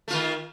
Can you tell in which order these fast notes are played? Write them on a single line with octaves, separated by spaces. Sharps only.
A3 F4 D#3